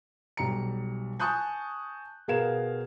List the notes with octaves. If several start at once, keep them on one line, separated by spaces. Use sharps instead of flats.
B1 G3 A#5 C#7
G#5 A5 C#6 D#6 F#6 G6
B2 G#4 A#4 F5 G#6 E7